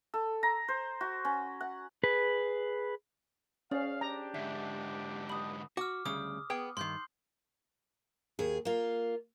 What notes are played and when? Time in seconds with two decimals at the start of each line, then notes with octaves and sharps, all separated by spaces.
0.14 A4
0.43 A#5
0.68 C5
1.01 F#4
1.25 C#4
1.61 F#5
2.03 G#4 B4
3.71 C#4 G#4 C5 D5 F5
4.01 D4 G4 A#5
4.34 G#2 D3 E5
5.30 B5 D#6
5.77 F#4 D6 F6
6.06 D2 C#3 G3 D#6
6.50 B3 G#4 G5
6.77 G2 D#3 C6 G6 C7
8.39 D#2 G#4
8.65 A#3 F4